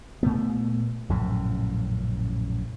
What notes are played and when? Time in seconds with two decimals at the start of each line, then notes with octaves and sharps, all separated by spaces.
0.23 A#2 A3 B3
1.09 A#1 F#2 A2 C#3